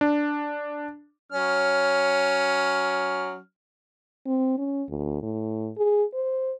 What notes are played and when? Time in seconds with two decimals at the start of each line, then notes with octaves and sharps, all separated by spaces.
0.01 D4
1.32 F#3 C#4 F6
4.27 C4
4.58 C#4
4.89 D2
5.23 A2
5.77 G#4
6.14 C5